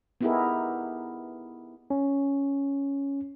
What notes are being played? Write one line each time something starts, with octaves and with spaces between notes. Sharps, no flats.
B3 D#4 E4 G4 G#4 A#4
C#4